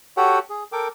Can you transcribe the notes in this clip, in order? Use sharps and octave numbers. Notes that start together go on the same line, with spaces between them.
F#4 G4 A4 C#5 F#5 G5
G#4
A4 A#4 G5 D6